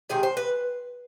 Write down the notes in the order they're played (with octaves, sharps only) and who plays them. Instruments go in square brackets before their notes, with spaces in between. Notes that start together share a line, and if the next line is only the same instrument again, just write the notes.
[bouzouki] C3 D#3 G#3 G#4
C5
B4